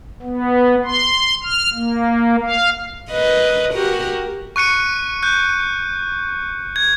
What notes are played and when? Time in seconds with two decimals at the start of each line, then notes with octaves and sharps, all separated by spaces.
0.22 B3
0.85 C6
1.43 F6
1.74 A#3
2.43 F5
3.11 A#4 B4 D#5
3.74 F#4 G4 A#4
4.56 C#6 F#6 C#7 D#7
5.23 F#6 G6
6.76 G#6